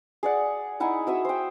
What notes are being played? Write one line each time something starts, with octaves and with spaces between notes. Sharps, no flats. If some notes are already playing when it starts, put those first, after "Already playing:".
G#4 D5 F#5
D#4 E4 F#5 G#5
F#4 E5 D#6 E6
C5 G5